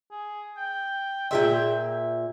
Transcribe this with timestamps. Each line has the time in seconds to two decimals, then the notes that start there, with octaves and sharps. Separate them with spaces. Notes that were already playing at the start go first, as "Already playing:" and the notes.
0.11 G#4
0.57 G5
1.31 A#2 G3 F4 G#4 E5 C6
1.52 G#4